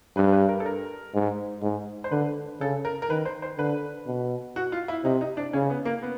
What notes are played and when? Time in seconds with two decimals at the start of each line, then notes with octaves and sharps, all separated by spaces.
0.16 G2 B4
0.33 B4
0.49 A#4
0.60 A4
0.66 A#4
1.14 G#2
1.62 G#2
2.04 C5
2.11 D3 B4
2.60 C#3 A4
2.85 A#4
3.02 A#4
3.09 D#3 B4
3.25 C5
3.42 C5
3.58 D3 B4
4.07 B2
4.56 F#4
4.72 F4
4.88 E4
5.04 C3 D#4
5.21 D#4
5.37 D4
5.53 C#3 C#4
5.70 B3
5.85 A#3
6.02 B3